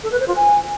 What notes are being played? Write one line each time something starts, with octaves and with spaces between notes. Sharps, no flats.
A4
B4
C5
F4
G#5